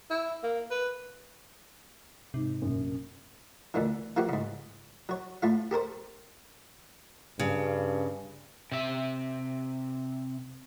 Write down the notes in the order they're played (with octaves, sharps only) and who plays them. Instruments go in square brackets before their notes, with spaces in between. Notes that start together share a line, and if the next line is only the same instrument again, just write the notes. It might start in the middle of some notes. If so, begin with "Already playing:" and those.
[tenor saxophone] E4
A#3
B4
[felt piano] G#2 [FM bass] C3
[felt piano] A#1 F#2
[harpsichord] D2 A#2 D3 E3
E3 F3 A#3 F#4 G4
G#2 C#3
F#3 C#5
A2 A3 F4 F5
G4 A4 A#4 C5
[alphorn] G2 [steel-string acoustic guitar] C#3
[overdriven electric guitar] C3 E5